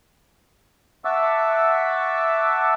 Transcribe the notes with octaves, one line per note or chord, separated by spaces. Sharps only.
E5 F#5 A5 C#6 D6 E6